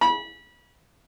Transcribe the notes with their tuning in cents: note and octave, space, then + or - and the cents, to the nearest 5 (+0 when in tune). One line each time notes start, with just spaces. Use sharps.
B5 -30